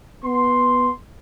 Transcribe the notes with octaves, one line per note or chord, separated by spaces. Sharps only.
B3 C6